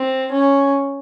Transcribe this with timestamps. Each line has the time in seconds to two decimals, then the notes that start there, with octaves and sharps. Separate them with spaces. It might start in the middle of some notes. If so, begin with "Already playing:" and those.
Already playing: C4
0.31 C#4